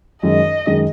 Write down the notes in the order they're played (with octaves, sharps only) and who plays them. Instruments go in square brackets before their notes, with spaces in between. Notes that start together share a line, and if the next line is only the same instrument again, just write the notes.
[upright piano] F#2 D#3 G#3 [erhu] D#5
[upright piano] F#2 D#3 G#3